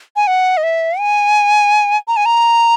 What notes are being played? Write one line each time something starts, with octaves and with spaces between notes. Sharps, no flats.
G#5
F#5
D#5
E5
G#5
A#5
G#5
A#5